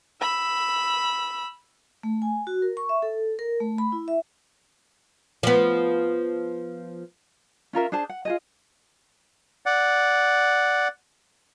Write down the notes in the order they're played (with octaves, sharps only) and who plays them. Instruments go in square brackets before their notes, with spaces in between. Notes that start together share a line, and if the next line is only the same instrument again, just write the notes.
[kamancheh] B5 E6
[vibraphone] A3
G#5
F#4
A#4
C#6
E5
A4
A#4
A3
B5
E4
E5
[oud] F3 B3
[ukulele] C#4 F4 A#4 E5
D4 G#4 C5 A5
F#5
F4 G#4 D#5
[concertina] D5 F#5